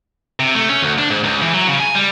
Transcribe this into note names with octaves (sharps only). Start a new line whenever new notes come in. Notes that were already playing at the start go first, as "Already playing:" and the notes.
C3
A3
C#4
D2
D4
G#2
C#2
E3
F#3
C#3
G#5
G3